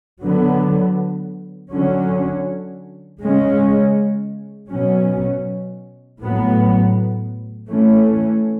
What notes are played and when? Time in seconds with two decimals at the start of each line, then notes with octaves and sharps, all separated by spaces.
0.22 D3 F#3 B3
1.72 D3 F#3 C#4
3.21 C#3 G#3 C#4
4.70 B2 F#3 C#4
6.20 A2 F#3 B3
7.69 E3 A3 C#4